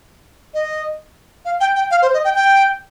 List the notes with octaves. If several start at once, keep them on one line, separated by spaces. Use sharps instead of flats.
D#5
F5
G5
G5
F5
C5
D#5
G5
G5